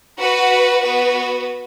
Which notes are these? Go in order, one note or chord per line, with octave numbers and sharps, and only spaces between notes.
F#4 B4 F#5
B3 F#4 B4